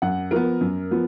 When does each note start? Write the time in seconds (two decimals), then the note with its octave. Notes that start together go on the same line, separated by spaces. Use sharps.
0.02 F#2 F#5
0.31 F3 B3 A#4
0.61 F#2
0.91 F3 B3